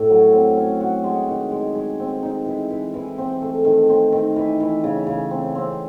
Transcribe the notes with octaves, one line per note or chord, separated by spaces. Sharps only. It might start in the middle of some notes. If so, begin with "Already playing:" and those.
Already playing: A2
F#3
C4
C#4
F#4
G#3
D#3
G#3
G#3
C4
D#4
E3
E3
E3
C4
A3
D#3
C4
D#3
E3
E3
C#3
C#3
C4
C4